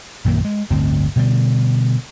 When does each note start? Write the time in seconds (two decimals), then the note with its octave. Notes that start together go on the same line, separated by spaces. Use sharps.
0.24 A#1 F#2 D#3 A#3
0.45 G#3
0.70 D1 G1 D2 C4
1.16 B2 D3 E3 G3